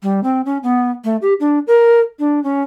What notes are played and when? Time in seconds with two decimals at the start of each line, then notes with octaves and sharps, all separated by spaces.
0.03 G3
0.24 C4
0.46 C#4
0.63 B3
1.04 A3
1.22 G4
1.40 D4
1.67 A#4
2.19 D4
2.44 C#4